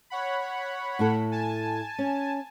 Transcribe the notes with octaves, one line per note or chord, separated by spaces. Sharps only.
C#5 F#5 B5
A2 E4 A4
G#5 A5
C#4